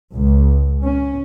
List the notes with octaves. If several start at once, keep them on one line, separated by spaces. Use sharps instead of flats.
C#2
C#4